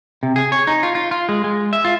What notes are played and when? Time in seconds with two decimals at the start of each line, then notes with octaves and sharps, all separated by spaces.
0.23 C3
0.36 G#4
0.52 C#5
0.67 D#4
0.83 F4
0.95 F4
1.11 F4
1.29 G#3
1.44 G#3
1.73 E5
1.85 F4